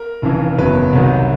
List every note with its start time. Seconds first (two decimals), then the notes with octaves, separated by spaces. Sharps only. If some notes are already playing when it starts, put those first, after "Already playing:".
Already playing: A#4
0.22 F1 F2 C#3 E3
0.58 F#1 E2 C#3 F#3 B4
0.93 C2 C3 D#3 F#3